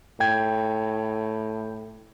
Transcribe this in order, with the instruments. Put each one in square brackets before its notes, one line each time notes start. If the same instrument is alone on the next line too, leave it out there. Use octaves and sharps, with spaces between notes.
[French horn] A2 [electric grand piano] G5 G#6